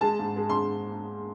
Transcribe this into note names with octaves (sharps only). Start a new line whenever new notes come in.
G#3 A5
G#2
G#3
C6